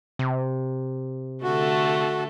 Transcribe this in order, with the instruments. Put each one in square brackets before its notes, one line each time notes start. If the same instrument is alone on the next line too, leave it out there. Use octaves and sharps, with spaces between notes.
[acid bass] C3
[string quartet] D3 A3 A4 [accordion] F#4